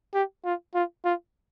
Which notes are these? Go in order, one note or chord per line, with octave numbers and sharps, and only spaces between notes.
G4
F4
F4
F4